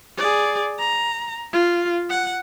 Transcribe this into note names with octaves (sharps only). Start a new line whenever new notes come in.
G#4 D5
A#5
F4
F#5